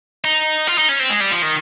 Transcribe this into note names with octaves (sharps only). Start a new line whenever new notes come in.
D#4
F4
D#4
C#4
C4
G#3
G3
F3
D#3